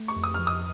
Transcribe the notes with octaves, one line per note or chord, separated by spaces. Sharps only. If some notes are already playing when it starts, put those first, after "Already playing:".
Already playing: A3
C#6
F2
D#6
F3 F6
D#6